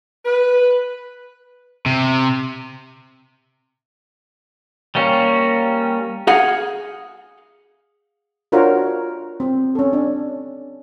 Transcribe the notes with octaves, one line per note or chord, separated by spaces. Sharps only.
B4
C3
G3 A#3 C#4
G#4 F5 F#5
D4 F4 F#4 A#4 C5 C#5
C4
C#4 A4
D4